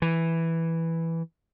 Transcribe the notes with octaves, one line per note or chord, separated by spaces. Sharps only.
E3